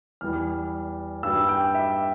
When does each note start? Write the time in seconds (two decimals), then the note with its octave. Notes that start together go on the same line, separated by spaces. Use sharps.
0.21 E2 E3 G3 F6
1.23 G2 G3 E6
1.49 G5
1.74 E5